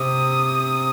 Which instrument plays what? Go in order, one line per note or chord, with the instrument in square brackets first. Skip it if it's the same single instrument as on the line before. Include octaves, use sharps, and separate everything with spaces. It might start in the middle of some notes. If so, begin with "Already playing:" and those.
Already playing: [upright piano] C3 [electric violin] D#6